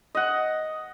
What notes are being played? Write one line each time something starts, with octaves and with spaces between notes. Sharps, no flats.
D#5 F#5